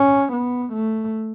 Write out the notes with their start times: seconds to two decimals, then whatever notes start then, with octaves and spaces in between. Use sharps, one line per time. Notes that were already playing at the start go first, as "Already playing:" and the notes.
Already playing: C#4
0.33 B3
0.73 A3